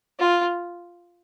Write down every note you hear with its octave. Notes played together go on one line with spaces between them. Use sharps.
F4